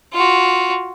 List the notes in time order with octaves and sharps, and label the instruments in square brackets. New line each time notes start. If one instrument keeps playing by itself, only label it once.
[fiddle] F4 F#4